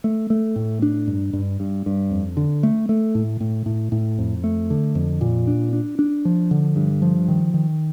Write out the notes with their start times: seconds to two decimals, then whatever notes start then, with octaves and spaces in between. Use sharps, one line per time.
0.04 A3
0.30 A3
0.56 A2
0.82 D4
1.07 G2
1.33 G2
1.60 G2
1.86 G2
2.11 F2
2.37 D3
2.63 A3
2.89 A3
3.15 A2
3.40 A2
3.66 A2
3.92 A2
4.18 F2
4.44 A3
4.70 D3
4.95 F2
5.21 A#2
5.47 D4
5.73 D4
5.99 D4
6.25 F3
6.51 D3
6.76 G2
7.02 F3
7.28 D#3
7.54 D#3